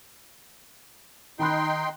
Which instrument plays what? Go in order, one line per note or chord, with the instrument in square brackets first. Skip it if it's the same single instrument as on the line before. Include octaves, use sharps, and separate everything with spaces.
[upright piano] D#3 B5 F#6 [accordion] D#4 G5 C6